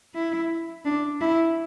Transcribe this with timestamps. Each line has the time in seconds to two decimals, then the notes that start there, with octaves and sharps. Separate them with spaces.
0.15 E4
0.85 D4
1.20 E4